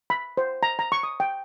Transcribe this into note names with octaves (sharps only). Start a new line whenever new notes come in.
B5
C5
A#5
A#5
C#6
D#6
G5